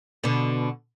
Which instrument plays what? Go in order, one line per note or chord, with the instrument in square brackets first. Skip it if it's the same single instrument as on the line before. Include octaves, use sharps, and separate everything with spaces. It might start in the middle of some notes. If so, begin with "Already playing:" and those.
[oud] B2 D3